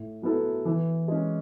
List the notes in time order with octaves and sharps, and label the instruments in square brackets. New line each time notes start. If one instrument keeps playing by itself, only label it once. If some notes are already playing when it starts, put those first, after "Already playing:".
Already playing: [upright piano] A2
F#3 B3 E4 A4
E3
G#3 C#4